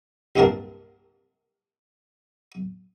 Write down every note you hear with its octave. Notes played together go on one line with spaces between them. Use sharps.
C2 G2 A#2 C4 A#4 A5